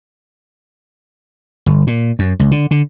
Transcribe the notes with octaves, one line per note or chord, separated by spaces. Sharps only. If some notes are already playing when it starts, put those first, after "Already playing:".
G1
A#2
F#2
C#2
D3
D3